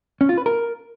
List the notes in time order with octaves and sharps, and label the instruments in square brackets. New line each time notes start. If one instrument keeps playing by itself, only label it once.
[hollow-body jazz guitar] C#4
F4
B4
A#4